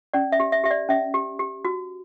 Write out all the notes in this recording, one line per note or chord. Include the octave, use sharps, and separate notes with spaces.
C#4 D5
E5
G4
E5
G4 E5
D5
C#4 E5
G4
G4
F#4